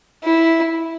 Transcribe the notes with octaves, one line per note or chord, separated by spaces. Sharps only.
E4